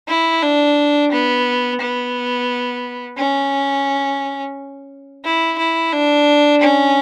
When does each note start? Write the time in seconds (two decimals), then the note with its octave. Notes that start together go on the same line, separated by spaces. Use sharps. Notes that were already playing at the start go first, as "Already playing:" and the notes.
0.08 E4
0.43 D4
1.12 B3
1.81 B3
3.18 C#4
5.24 E4
5.59 E4
5.93 D4
6.62 C#4